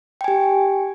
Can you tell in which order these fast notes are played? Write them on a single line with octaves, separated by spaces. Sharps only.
G5 G#5 G4